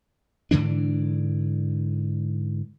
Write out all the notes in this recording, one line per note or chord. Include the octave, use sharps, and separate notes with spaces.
G#2 D3 E3 D4